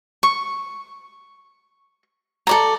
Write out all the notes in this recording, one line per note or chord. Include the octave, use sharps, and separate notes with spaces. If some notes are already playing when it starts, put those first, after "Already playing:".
C#6
A4 D5 A#5